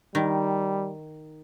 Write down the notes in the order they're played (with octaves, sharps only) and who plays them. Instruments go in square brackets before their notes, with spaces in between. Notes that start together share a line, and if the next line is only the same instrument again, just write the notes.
[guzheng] D#3 [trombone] G3